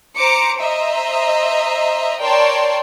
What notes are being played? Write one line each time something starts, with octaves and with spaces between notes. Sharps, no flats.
C5 A#5 D6 C#7
C5 D#5 E5 A#5
A#4 C#5 D5 G5 A5 C6